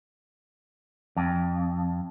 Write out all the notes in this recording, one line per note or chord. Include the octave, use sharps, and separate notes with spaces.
F2